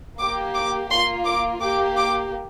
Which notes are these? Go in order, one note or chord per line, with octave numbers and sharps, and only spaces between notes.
A#3 G4 D6
D6
A#3 F4 C6
D6
A#3 G4 D6
D6